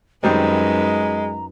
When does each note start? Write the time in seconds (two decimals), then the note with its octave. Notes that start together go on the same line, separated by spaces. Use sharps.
0.24 F#2 D#3 G3 G#3 C4 D#4 B4 A#5